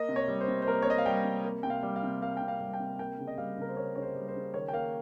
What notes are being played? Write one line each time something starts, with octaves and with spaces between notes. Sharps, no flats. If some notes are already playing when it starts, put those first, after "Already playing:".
Already playing: A#3 D#5
C3
C#5
G3
C5
C3
C5
A#3 A#4
C#5
C3 D#5
F5
G3 G5
C3
A#3
C3 G5
F5
G3
F5
C3
A#3 F5
C3 G5
F5
G3
G5
C3
A#3 G5
C#3
D#5
G3 F5
C#3 A#4
C5
A#3 C#5
C#3 C#5
C5
G3
C5
C#3
D#3 C#5
G5
A#3 F5